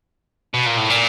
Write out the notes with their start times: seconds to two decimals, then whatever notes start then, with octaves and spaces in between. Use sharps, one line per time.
0.54 B2
0.66 A#2
0.77 A2
0.90 A#2